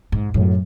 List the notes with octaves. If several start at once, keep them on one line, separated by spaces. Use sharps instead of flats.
G#2
F#2 A2 F#3